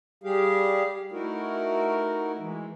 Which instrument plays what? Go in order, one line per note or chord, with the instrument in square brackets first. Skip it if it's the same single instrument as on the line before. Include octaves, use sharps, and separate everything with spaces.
[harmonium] G3 G4 G#4 F5
A3 D#4 E4 F#4 A#4
E3 G#3